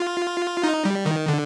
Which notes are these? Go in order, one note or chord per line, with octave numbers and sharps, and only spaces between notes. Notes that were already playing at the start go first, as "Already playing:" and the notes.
Already playing: F4
D#4
G3
D#3
D3